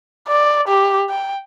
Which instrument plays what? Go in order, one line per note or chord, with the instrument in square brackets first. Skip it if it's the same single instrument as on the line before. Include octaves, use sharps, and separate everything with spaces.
[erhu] D5
G4
G5